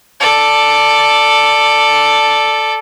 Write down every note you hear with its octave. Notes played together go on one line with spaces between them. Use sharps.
A4 D5